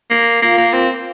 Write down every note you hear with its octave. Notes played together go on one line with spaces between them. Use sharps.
A#3
A#3 F4 A#4 F5
A#3
C4